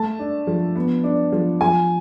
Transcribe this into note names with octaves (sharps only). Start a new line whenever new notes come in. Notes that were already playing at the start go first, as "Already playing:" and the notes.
Already playing: A3 A5
D4
F3
B3
D4
F3
F3 G#5